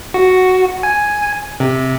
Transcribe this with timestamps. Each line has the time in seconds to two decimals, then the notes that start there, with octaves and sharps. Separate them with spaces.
0.14 F#4
0.83 G#5
1.60 C3